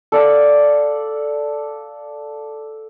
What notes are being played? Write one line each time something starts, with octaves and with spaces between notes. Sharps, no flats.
A4 D5 F5 F#5